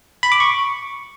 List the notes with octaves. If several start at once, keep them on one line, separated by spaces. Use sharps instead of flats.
B5
D6
C#6